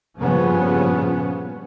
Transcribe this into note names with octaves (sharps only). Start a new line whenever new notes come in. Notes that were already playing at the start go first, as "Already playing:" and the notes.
G2 A#2 C#3 F3 B3 C#4